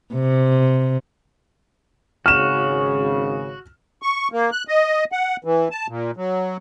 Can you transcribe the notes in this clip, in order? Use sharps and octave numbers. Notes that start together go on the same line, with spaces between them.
C3
G#1 C#3 F#4 F6 E7
C#6
A#3
F#6
D#5
F#5
E3
A5
A#2
F#3